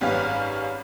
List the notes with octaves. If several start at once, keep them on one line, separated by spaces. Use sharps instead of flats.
G#1 F#2 G3 B4 C#5 F5